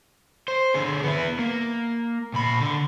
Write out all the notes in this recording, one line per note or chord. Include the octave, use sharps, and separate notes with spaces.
C5
D3 G#4
B3 E4
A#3
A#2 B5
D3